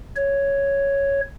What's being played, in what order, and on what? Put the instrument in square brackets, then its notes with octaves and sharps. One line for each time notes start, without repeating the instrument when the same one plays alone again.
[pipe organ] C#5